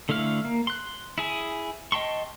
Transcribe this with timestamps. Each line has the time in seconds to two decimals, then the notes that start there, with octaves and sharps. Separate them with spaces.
0.09 D3 A3 E4 F5 F6
0.45 A#3
0.67 C6 F#6
1.18 E4 G#4 G#5
1.92 D#5 G5 A5 C6 C#6